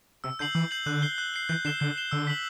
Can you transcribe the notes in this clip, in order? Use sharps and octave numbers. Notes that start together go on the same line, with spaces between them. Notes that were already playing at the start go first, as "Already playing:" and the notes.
C3 E6
D3 G6 C7 F#7
E3 E6
G6 C7 F#7
D3 F#6
C7 G7
F#6
C7 G7
E3 G6
D3 C7 E7 G7
D3 G6
C7 E7 G7
D3 E6
B6 F#7